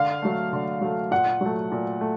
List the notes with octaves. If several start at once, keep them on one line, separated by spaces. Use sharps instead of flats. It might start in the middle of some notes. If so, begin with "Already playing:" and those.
Already playing: D3 F5
F#3 A3
D3
F#3 A3
A#2 F#5
F#3 A3
A#2
A3